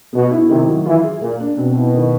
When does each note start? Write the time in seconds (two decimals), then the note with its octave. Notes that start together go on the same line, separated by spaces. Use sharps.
0.13 B2 B3
0.31 E4
0.49 C3 D#3
0.67 F#3
0.86 E3 F4
1.04 G#4
1.21 A#2 A#3
1.40 D4
1.58 B2 C4
1.75 E4
1.94 D#3